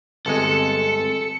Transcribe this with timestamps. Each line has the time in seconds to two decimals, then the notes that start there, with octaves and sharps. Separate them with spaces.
0.26 G1 G#3 C4 A4 C#7